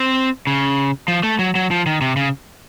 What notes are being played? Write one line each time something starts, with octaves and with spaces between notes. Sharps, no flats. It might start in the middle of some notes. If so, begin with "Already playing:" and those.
Already playing: C4
C#3
F3
A3
F#3
F#3
F3
D#3
C3
C#3